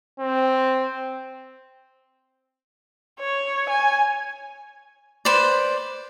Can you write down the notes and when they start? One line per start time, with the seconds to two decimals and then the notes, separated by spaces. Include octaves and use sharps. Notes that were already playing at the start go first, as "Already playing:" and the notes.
0.20 C4
3.20 C#5
3.70 G#5
5.25 B4 C5 D5